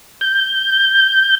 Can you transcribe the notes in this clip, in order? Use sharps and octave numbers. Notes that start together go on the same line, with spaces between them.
G6